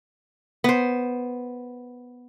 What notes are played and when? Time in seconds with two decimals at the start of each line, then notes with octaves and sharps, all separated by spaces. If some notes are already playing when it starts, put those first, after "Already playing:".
0.64 B3 C5